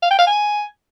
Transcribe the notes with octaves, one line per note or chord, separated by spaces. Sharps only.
F5
G5
F5
G#5